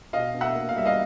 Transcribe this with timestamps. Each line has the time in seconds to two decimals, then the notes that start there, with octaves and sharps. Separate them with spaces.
0.13 B2 D#5 F5
0.34 B2
0.41 E5 F#5
0.55 A#3
0.69 F5
0.76 G3 E5
0.85 D#5 F5